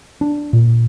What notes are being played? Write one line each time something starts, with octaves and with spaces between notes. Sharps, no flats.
D4
A#2